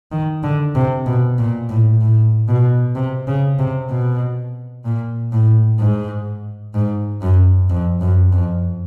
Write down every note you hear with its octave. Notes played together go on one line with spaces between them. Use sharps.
D#3
D3
C3
B2
A#2
A2
A2
B2
C3
C#3
C3
B2
A#2
A2
G#2
G#2
F#2
F2
F#2
F2